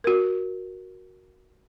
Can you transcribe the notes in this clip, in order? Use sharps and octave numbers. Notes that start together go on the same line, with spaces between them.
F#4 A#4